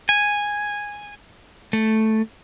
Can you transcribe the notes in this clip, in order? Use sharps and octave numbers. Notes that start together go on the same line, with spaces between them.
G#5
A3